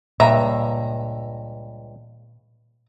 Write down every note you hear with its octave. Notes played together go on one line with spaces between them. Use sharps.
C#2 G2 A#2 E5 A#5